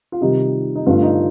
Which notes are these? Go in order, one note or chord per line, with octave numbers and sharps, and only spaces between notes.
F4
C3 D#3 G3 D#4 G4
D#4
G2 D3 A3 F4
D#4